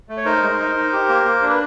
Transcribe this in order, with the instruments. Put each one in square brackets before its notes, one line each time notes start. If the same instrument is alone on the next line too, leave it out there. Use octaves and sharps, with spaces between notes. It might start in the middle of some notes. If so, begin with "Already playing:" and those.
[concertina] A3
C#5
D#4 A#4 C5
G#3
D#4
D#4
G4
A#3
A#3
D4
B4